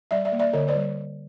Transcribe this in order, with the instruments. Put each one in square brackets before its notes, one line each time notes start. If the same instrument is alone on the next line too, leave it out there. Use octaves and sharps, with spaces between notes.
[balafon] G3 D5 E5
D5 E5
A#3
D5 E5
D3 C#5 D#5
C5 D5
G3